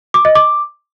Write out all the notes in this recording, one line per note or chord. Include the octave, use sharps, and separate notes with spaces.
D6
D#5
D6